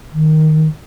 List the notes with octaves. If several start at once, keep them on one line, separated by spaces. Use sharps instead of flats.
D#3